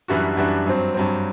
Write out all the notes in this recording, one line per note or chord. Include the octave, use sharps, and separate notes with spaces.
F#2 E3 G3 D4 F#4
F#2 E3 G3 D4 F#4
G2 F#3 C4
G2 F#3 C4